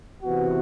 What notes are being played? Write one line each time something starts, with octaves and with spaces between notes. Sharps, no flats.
C3 E3 B3 F#4